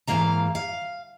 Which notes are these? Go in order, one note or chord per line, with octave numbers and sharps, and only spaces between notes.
G#2 E3 A#3 F5 A#5
F5